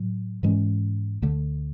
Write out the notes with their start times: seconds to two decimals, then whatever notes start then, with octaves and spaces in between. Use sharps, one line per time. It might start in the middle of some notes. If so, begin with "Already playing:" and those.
Already playing: A2 F#3
0.43 G#2 E3 G#3 C#4
1.22 D2 D3 A3